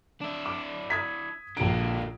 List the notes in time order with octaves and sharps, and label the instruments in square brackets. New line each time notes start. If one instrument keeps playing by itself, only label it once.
[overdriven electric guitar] D4 E4
[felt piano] D6
D#6 G#6 B6
[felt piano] A#1 F#4 D7 [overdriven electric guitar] D3 A#3